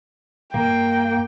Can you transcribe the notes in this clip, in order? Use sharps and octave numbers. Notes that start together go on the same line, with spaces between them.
G2 A#3 G5